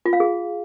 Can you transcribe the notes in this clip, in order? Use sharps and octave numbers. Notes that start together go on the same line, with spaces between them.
F4
F5
G#4